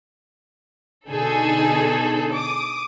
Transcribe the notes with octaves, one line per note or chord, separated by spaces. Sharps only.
B2 D3 D#4 G#4 A4
D6 D#6